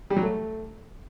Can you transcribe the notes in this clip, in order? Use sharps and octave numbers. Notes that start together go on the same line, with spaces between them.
G3
F#3
A3